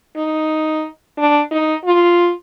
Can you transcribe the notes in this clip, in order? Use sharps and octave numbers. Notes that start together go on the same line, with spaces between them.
D#4
D4
D#4
F4